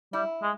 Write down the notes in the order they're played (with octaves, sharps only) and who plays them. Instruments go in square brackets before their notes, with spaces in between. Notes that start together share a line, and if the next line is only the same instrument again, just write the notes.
[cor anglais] G3 [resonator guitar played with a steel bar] E4
[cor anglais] G#3